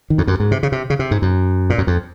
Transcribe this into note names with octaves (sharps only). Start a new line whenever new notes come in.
D#3
F2
F#2
G#2
C3
C#3
C3
C#3
C3
G#2
F#2
A#2
F#2
F2